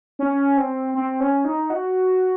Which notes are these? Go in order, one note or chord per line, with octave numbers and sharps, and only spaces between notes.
C#4
C4
C4
C#4
D#4
F#4